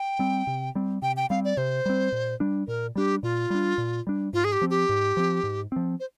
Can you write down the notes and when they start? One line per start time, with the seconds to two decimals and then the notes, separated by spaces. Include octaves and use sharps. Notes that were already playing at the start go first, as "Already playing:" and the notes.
Already playing: G5
0.19 G3 C4
0.47 C3
0.75 G3 C4
1.02 C3 G5
1.16 G5
1.30 G3 C4 F5
1.45 D5
1.57 C3 C5
1.86 G3 C4
2.12 A#2
2.40 G3 D4
2.68 A#2 A#4
2.96 G3 D4 G4
3.23 A#2 F4
3.50 G3 D4
3.78 A#2
4.07 G3 D4
4.33 G#2 F4
4.44 G#4
4.52 G4
4.61 F3 C4
4.70 G4
4.89 G#2
5.17 F3 C4
5.43 G#2
5.72 F3 C4
6.00 C5